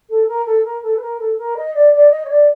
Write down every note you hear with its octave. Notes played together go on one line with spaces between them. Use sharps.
A4
A#4
A4
A#4
A4
B4
A#4
A4
A#4
D#5
D5
D5
D#5
C#5
D5